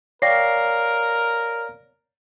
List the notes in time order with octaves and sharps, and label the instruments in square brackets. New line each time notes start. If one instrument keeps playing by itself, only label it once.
[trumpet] A#4 [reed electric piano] C#5 D5 F5 [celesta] G5 A#6 C7